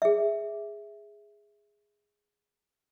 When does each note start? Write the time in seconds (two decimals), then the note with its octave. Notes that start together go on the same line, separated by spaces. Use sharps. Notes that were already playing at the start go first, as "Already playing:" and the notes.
0.02 G#4 E5